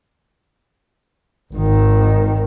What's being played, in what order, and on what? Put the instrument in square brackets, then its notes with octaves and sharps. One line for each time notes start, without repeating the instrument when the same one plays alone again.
[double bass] G#1 D#3